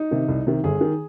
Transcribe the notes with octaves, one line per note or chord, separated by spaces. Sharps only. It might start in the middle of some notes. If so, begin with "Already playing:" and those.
Already playing: D#4
C3 D#3
C2
C3 D#3
G1 G#4
D#3